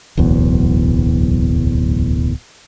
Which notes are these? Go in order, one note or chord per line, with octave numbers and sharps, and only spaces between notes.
D1 B1 E2